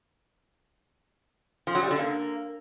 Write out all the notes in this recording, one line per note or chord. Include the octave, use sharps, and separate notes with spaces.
F3
F#3
G3
D3
A#3